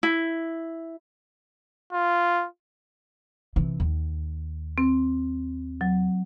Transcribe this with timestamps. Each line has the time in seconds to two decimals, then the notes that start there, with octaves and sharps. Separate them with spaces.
0.03 E4
1.93 F4
3.56 C3 E3
3.80 D#2
4.78 C4
5.81 F#3